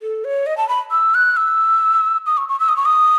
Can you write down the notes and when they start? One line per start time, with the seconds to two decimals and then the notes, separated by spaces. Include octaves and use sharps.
0.02 A4
0.25 C#5
0.46 D#5
0.57 A5
0.69 B5
0.91 E6
1.15 F#6
1.37 E6
2.26 D#6
2.37 C#6
2.49 C#6
2.60 E6
2.69 D#6
2.77 C#6
2.85 D#6